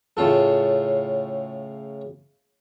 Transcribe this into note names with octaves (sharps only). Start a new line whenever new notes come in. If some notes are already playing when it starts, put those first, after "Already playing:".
A2 C#3 F4 A4